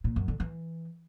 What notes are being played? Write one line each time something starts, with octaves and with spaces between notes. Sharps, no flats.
A#2
F#2
D3
E3